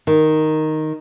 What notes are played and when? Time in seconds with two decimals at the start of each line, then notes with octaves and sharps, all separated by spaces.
0.07 D#3